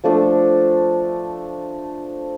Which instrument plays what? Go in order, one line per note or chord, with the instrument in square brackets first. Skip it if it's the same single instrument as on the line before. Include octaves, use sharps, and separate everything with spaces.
[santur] F3 A3 D4 A4